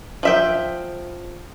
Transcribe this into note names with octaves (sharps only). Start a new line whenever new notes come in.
F3 E5 G5